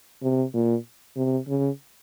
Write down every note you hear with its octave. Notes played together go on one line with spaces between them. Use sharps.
C3
A#2
C3
C#3